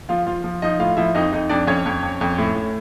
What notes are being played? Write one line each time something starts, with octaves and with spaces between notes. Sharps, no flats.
F3 F4 F5
F3 F4 F5
F3
F3 D#4 D#5
A2 F4 F5
F3 E4 E5
F2 D#4 D#5
F2 D#4 D#5
F2 D4 D5
F2 C#4 C#5
F2
F2
F2
A2
A2